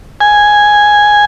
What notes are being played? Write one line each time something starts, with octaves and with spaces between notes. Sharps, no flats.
G#5